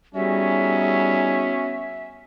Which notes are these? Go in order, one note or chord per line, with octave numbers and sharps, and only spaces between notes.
G3 B3 C#4 D#4 F#4 G#4 E5